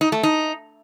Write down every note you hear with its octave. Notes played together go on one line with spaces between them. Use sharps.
D#4
A3
D#4